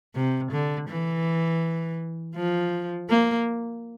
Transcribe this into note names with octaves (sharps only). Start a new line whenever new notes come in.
C3
D3
E3
F3
A#3